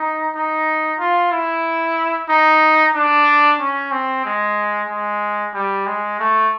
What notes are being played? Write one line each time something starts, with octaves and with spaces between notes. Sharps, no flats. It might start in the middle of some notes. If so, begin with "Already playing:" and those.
Already playing: D#4
D#4
F4
E4
D#4
D4
C#4
C4
G#3
G#3
G3
G#3
A3